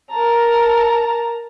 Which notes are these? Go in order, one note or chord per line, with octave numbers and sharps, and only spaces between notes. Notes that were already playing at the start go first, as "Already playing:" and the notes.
A#4 A5 A#5